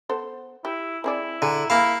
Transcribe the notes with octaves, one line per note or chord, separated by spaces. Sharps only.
B3 A4 C5
E4 G4
C4 E4 G#4 D5
D3 G#4 A#5
A#3 E4 G#4 F5 B5